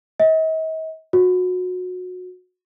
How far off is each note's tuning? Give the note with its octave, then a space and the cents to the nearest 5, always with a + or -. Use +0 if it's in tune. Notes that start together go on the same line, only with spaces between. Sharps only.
D#5 +45
F#4 -25